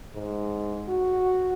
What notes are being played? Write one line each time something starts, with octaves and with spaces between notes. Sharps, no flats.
G#2
F#4